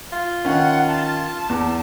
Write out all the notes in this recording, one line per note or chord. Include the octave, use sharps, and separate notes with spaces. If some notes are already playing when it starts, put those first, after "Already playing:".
F4
D#3 C#4 F#5
A5
E2